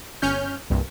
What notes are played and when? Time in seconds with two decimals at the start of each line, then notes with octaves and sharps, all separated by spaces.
0.22 G1 C#4 F6 G6
0.70 C2 G2 A#2